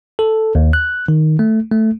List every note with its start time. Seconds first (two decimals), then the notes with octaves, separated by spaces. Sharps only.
0.19 A4
0.55 D#2
0.73 F#6
1.08 D#3
1.39 A3
1.71 A3